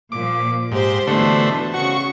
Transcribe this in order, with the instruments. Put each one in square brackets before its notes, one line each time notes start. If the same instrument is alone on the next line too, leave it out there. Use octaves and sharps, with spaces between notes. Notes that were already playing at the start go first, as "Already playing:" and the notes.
[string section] A#2 F3 [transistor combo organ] D6
[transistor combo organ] G#2 [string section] G4 C5
[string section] B2 E3 [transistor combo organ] D3 A3 C5
[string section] C#3 C#6 [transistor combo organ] F#4